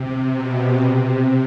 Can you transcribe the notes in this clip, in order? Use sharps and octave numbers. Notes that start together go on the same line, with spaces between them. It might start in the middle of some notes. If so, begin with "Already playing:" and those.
Already playing: C3
B2
C3